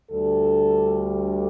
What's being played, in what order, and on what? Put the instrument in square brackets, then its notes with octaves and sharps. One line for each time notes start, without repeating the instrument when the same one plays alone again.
[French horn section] D2 D3 G3 D4 A4